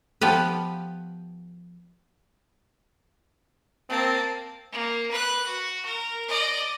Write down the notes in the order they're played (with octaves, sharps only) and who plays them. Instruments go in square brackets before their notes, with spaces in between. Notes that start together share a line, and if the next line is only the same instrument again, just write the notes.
[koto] F3 B3 G4 B4
[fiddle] A#3 A5 [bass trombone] C4
[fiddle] A#3
B4 F#6
F#4
A#4
D5 D#5